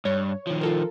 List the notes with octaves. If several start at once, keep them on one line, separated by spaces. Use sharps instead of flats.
G2 C#5
D#3 F3
F4 A4 A#4